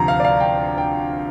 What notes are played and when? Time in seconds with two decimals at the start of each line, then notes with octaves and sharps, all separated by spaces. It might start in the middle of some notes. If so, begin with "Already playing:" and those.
Already playing: D2 C3 F3 A#5
0.08 F5
0.20 D5
0.24 F5
0.40 G5
0.78 G5